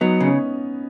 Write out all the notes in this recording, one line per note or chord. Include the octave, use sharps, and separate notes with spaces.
F#3 B3 D#4
C#3
C#4